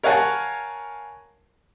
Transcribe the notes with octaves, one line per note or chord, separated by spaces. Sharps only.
A#4 C#5 F5 F#5 G#5 A5